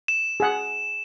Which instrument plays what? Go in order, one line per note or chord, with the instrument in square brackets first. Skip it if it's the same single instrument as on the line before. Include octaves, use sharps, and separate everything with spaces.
[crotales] E7
[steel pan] G#4 F#5